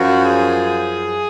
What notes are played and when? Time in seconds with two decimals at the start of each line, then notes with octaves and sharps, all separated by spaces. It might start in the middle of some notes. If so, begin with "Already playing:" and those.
Already playing: F#2 F3 F#4
0.25 G#4